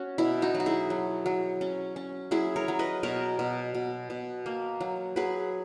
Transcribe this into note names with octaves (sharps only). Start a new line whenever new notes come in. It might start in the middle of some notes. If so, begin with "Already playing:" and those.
Already playing: C#4 F#4
B2 E4
D#4 F#4
F#3
F#4
E4 G#4
F#3
F#3
C#4
C#4
F#3 E4 G#4
A#4 C#5
F#3
B4 D#5
B2 A#4 C#5
B2
B2
B2
A#3
F#3
F#3 G#4 B4